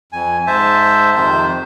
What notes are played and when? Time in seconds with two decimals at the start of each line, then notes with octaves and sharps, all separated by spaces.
0.13 F2 G#5
0.47 G#2 C5 E5 A5
1.15 F2 C3 D#3 C5